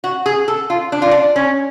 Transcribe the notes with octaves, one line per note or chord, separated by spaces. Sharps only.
F#4
G#4
A4
F4
D4
F4
D4
C#4